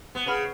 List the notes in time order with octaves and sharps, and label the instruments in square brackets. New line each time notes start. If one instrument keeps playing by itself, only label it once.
[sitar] B3
[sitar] C#3 [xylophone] G#4 B4 F#5 B5 F6